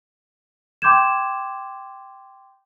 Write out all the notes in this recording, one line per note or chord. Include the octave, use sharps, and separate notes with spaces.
G5 C6 D6 G6 G#6 E7